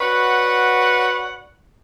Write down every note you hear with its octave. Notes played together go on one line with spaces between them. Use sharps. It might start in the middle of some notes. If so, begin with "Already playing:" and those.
F#4 B4 C#5 D5 F#5